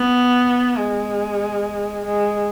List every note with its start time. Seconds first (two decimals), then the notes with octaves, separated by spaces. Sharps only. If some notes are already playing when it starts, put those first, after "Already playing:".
Already playing: B3
0.77 G#3
2.06 G#3